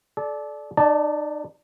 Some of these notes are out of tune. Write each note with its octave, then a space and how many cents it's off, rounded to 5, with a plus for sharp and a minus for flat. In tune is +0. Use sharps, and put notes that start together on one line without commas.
A4 -35 D5 +0
D#4 -35 D5 +0 A5 +0